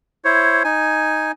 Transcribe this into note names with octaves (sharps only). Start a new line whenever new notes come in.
E4 C5 C#5
D#4 G#5